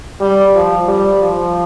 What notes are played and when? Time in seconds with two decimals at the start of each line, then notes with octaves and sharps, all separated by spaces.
0.21 G3
0.55 F3
0.88 G3
1.22 F3